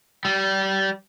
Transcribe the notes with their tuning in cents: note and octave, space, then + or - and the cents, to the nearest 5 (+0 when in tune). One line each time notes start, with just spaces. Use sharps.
G3 -25